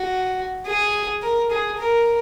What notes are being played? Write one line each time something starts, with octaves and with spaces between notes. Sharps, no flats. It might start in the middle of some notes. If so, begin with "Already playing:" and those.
Already playing: F#4
G#4
A#4
G#4
A#4